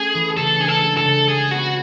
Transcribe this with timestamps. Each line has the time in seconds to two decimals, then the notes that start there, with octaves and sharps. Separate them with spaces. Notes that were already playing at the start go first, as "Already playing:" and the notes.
Already playing: A3 C#4 G#4
0.14 E3
0.37 C#3 A4
0.59 D4 G#4
0.68 A4
0.83 G#3
0.97 A4
1.05 C#3
1.28 G#3 G#4
1.51 B3 F#4